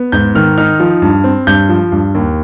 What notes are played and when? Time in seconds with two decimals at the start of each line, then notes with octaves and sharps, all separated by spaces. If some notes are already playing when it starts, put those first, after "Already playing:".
Already playing: B3
0.12 G#2 G6
0.35 D#3 F6
0.58 D#4 F6
0.80 F3
1.02 G2
1.24 C4
1.47 G2 G6
1.69 F3
1.92 G2
2.15 D#2